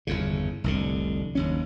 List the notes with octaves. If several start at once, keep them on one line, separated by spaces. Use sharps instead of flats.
G1 E2 C#3
F1 C2 D3
F#1 D#2 C#4